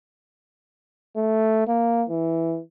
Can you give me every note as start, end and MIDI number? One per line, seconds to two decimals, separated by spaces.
1.16 1.67 57
1.68 2.04 58
2.09 2.60 52